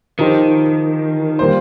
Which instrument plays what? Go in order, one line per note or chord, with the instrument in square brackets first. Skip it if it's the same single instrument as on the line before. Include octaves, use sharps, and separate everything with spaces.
[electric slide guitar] D#3 [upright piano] F3 D#4 G4 C5
[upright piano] G3 A#3 F4 C5